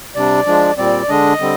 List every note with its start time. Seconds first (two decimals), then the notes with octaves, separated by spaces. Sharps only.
0.15 C3 G3 D4 D5
0.46 F3 G#3 D4
0.78 A#2 G3 C4 D5
1.09 D3 G#3 D4 D#5
1.40 D3 G3 C4